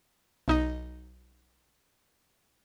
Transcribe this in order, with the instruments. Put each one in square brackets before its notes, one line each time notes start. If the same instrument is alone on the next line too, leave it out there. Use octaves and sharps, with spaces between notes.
[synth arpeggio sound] B1 D#4 D#5